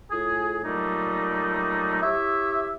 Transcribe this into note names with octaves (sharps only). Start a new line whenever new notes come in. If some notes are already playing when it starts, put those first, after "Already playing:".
A2 F4 G#4
A#2 F#3 G3 A3 D#4
E4 G4 C#5 E5